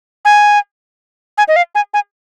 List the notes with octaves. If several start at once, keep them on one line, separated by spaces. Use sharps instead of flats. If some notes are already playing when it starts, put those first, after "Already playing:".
G#5
G#5
D#5
F5
G#5
G#5